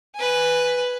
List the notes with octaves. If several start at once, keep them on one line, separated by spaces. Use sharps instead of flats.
B4 G#5